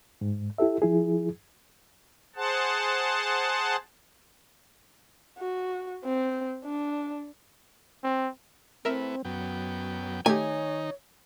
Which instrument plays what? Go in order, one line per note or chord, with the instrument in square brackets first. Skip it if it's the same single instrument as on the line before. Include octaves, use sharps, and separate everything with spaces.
[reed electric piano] G#2
E4 G4 A4 E5
F3 E4 G#4
[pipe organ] G#4 C5 F#5 A5
[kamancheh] F#4
C4
D4
[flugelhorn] C4
[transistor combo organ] A3 E4 B4 [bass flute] C4 [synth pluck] A#4 E5
[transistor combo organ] F#2 B3 G5 [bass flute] F#3
[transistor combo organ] D#3 D#4 [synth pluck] A3 G4 [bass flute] C#5 [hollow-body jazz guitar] G#5